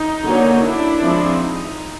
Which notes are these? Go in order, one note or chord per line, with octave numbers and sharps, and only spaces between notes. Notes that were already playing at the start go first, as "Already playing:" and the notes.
Already playing: D#4
D3 F#3 A#3 C#4
D4 E4
F3 G#3 C4
D#4